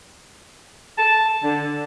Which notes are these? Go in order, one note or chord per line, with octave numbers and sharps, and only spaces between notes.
A5
D3